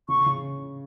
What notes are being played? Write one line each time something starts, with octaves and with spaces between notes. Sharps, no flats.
C#3 C#6
C#3